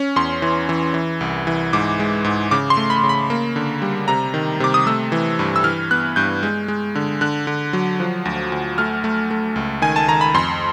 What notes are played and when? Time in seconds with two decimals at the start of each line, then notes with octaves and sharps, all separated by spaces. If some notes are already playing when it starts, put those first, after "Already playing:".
Already playing: C#4
0.16 E2 C6
0.42 E3
0.69 E3
0.94 E3
1.21 C2
1.47 E3
1.73 G#2 D6
2.00 G#3
2.24 G#2
2.51 C#3 D6
2.70 C6
2.77 A3
2.90 B5
3.03 C#3
3.09 B5
3.30 A#3
3.56 D3
3.82 G3
4.08 C3 A#5
4.34 D#3
4.60 C3 D6
4.74 D#6
4.87 A3 E6
5.12 E3
5.39 G2
5.56 E6
5.64 E3 F6
5.91 B3 F#6
6.16 G2 G6
6.43 G#3
6.68 G#3
6.95 D3
7.21 D3 F#6
7.47 D3
7.73 F#3
8.00 F3
8.25 D2
8.52 D2
8.78 A3 F6
9.04 A3
9.31 A3
9.56 C#2
9.82 D#3 G#5
9.96 A5
10.08 D#3 A#5
10.21 B5
10.34 F2 C6